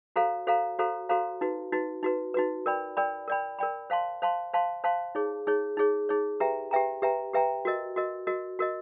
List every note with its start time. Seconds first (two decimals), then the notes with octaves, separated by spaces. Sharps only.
0.16 F#4 A4 C5 F5 A#5
0.47 F#4 A4 C5 F5 A#5
0.79 F#4 A4 C5 F5 A#5
1.09 F#4 A4 C5 F5 A#5
1.41 D#4 F#4 B4
1.72 D#4 F#4 B4
2.03 D#4 F#4 B4
2.34 D#4 F#4 B4
2.66 A#4 D5 G5 B5
2.97 A#4 D5 G5 B5
3.28 A#4 D5 G5 B5
3.59 A#4 D5 G5 B5
3.90 C5 F5 A5 C6
4.22 C5 F5 A5 C6
4.53 C5 F5 A5 C6
4.84 C5 F5 A5 C6
5.15 D#4 G#4 C#5
5.47 D#4 G#4 C#5
5.77 D#4 G#4 C#5
6.09 D#4 G#4 C#5
6.40 G4 B4 E5 G5 A#5
6.71 G4 B4 E5 G5 A#5
7.02 G4 B4 E5 G5 A#5
7.33 G4 B4 E5 G5 A#5
7.65 F#4 A#4 D#5
7.96 F#4 A#4 D#5
8.27 F#4 A#4 D#5
8.59 F#4 A#4 D#5